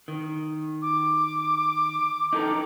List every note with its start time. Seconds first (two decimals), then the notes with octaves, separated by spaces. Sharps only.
0.08 D#3
0.82 D6
2.33 D#4 A4 A#4